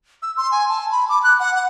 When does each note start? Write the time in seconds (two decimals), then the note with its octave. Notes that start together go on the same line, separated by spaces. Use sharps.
0.22 E6
0.37 C6
0.52 G#5
0.69 A5
0.92 B5
1.09 D6
1.23 F#6
1.40 F#5
1.55 F#5